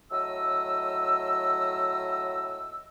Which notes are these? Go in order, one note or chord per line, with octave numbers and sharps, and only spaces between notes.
A2 F#3 D#5 E6